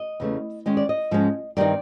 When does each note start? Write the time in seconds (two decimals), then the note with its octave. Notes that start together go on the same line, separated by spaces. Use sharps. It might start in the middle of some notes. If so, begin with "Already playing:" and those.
Already playing: D#5
0.20 E2 C#3 E3 A3
0.66 D#3 G#3 C#4 D#5
0.77 D5
0.89 D#5
1.11 G#2 F3 G#3 C#4
1.57 G2 D#3 G3 C4 D#4 D5